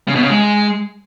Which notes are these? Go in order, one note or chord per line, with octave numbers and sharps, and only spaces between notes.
C#3
B2
C#3
G#3